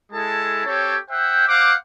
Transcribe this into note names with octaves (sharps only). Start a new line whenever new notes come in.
G#3 E4 G#4 A4 A5
C4 G4 A4 C#5
C5 E5 F#5 G5
C5 F5 F#5 D6